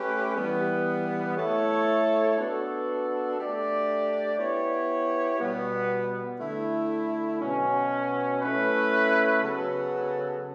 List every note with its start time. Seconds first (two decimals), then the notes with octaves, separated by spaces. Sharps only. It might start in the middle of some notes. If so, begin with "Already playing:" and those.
Already playing: A3 C#4 G4 B4
0.35 E3 G3 B3
1.37 A3 E4 A4 C#5
2.37 B3 D4 F#4 A4
3.38 A3 D4 G4 D5
4.38 B3 E4 G4 C#5
5.39 B2 G3 B3
6.39 D3 A3 E4
7.40 B2 F#3 C#4
8.40 A3 C#4 E4 B4
9.41 C#3 F#3 B3 F#4 A4